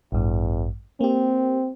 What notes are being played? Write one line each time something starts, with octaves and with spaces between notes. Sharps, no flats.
A1 E2 G2
A#3 C4 G4